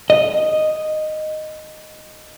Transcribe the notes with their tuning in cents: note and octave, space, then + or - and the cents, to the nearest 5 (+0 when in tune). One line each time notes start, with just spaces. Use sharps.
D#5 -5